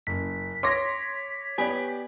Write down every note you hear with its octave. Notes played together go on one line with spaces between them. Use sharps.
F#1 B6
C#5 C6 D6 A#6
B3 G4 D5 G#5